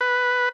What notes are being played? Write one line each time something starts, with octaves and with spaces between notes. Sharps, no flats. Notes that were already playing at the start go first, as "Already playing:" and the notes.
B4